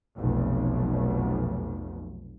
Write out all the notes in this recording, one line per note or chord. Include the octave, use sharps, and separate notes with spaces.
F1 B1